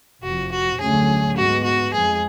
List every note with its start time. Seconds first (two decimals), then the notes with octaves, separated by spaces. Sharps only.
0.24 F1 F2 F3 F#4
0.52 F#4
0.80 D2 D3 F#3 A3 C#4 G#4
1.37 G#2 G#3 B3 F#4
1.65 F#4
1.93 F2 F3 G#3 G#4